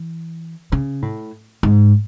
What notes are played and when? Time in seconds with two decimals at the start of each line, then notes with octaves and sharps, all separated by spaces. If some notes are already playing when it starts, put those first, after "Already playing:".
Already playing: E3
0.72 C#3
1.02 A2
1.63 G#2